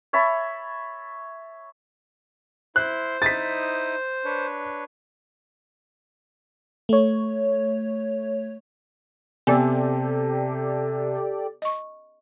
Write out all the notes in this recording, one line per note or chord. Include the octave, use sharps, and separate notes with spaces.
C#5 E5 A5 B5
E4 C5 C6 F#6
D#4 E4 D#6 A6 B6
D4 B4 C#5
A3 C#5
C3 B3 G4 A4 D5 G5 G#5
D#5 C#6